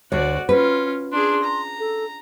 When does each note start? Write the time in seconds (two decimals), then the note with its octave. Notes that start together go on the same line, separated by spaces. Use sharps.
0.12 D2 F#4 C#5 D5
0.49 C#4 F4 B4
1.12 D4 G#4 C6
1.43 A#5
1.79 A4